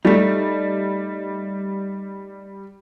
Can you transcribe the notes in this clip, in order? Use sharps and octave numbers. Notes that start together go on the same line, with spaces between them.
G3 A3 D#4